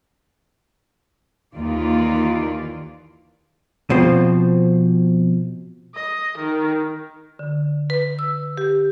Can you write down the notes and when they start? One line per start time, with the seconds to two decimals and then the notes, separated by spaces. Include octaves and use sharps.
1.54 D#2 D#3 E3 A#3 F4 D5
3.90 B2 F3 C4
5.94 D#5
6.38 D#3
7.39 D3
7.90 B4
8.19 E6
8.57 G4